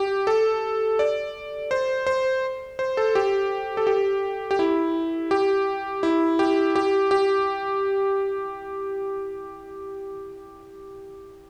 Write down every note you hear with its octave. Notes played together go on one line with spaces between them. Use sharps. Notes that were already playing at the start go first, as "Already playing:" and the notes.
Already playing: G4
A4
D5
C5
C5
C5
A4
G4
A4
G4
G4
E4
G4
E4
G4
G4
G4